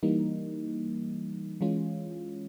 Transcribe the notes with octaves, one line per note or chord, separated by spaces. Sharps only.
E3 G3 A#3 D#4
E3 G#3 C#4 F4